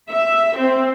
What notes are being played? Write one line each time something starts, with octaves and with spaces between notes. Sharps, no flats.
E5
C4